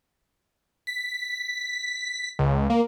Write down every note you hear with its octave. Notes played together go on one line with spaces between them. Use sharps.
B6
C#2
A#3